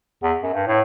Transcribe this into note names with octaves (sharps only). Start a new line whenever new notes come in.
E2
F#2
G2
A2